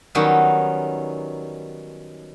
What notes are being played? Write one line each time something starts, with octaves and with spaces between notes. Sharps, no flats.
D#3 F#3 G3 B3 C#4 D#4